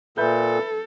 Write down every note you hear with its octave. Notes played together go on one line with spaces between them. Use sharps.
A#2 A4 B4 E5 G6